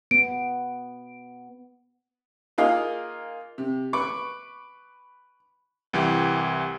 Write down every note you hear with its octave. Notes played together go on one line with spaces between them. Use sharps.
B3 D7
A#3 D#4 F4 G#4 D#5 F5
C3
B4 C#6 D6
C2 E3 G4